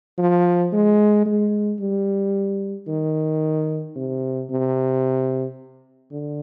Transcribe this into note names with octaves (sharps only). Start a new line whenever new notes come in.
F3
G#3
G#3
G3
D#3
C3
C3
D3